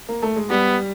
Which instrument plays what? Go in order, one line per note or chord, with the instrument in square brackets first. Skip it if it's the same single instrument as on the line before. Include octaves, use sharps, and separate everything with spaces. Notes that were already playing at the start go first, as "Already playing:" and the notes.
[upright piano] A#3
A3
G#3
[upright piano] G3 [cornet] B3